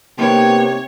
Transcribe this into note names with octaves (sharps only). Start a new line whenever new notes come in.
C3 A#3 B3 D#4 C#5 G5